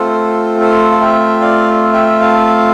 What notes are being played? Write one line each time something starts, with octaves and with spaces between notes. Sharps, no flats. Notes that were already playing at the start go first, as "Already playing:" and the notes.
Already playing: A3 C4 F4 A4 C5
A4 C5
F5
E5 G5
D5 F5
E5 G5
F5 A5